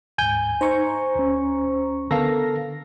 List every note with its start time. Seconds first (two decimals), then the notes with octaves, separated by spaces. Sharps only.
0.18 D2 G#2 G#5 G6
0.61 D#4 C5 A#5 C#6
1.15 D2 C#4
2.11 D3 B3 A4 A#4 F5 A#6